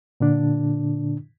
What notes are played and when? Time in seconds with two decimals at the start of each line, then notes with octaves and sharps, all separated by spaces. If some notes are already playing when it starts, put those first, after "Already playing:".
0.20 A#2 D3 D4